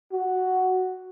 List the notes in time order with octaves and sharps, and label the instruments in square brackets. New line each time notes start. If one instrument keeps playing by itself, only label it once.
[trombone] F#4